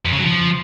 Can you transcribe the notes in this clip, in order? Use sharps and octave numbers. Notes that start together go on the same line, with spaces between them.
F2
C#3
F#3
F3